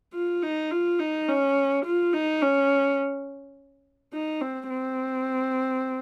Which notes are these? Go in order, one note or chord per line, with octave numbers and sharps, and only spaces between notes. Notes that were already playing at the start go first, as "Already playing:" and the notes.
F4
D#4
F4
D#4
C#4
F4
D#4
C#4
D#4
C4
C4